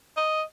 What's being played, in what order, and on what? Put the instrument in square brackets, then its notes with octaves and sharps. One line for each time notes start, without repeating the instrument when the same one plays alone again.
[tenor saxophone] D#5